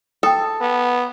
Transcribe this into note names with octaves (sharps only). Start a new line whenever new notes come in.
A4 G5 D#6
B3